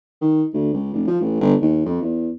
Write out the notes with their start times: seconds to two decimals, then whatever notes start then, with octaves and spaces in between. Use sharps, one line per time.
0.21 D#3
0.54 D2
0.74 C#2
0.94 F1
1.08 F3
1.21 A1
1.41 G1
1.61 D#2
1.86 F2
2.02 E2